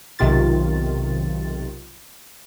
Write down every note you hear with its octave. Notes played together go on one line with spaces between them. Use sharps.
B1 C3 D#3 F4 A6